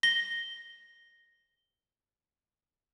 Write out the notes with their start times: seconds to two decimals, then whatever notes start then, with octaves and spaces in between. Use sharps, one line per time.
0.03 A#6 G7